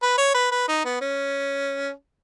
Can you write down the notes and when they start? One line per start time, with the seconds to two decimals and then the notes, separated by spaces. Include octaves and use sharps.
0.02 B4
0.18 C#5
0.34 B4
0.52 B4
0.69 D#4
0.85 B3
1.01 C#4